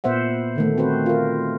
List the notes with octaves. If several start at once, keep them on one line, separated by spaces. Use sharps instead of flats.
A#2 B3 C5 E5 F#5
D3 D#3 A3
C4 F#4 B4 C5
F4 A#4